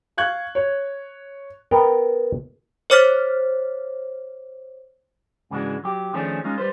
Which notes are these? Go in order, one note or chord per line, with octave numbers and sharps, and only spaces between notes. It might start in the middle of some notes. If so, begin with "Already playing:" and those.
F5 C#6 F#6 G#6
C#5
B3 A#4 G5
C5 C#5 D6 F6 A6 B6
G#2 C#3 E3 G#3 D4 F#4
F#3 G4
D#3 F3 A3 C#4 D4 G#4
G#3 C#4 D#4 F4
G3 B4 C5